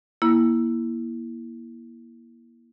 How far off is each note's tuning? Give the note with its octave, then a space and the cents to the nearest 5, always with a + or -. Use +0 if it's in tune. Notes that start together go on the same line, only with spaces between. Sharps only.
A#3 +25 E4 +0